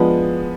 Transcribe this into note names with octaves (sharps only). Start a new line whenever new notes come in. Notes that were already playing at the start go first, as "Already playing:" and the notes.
Already playing: F3 G#3 B3 D4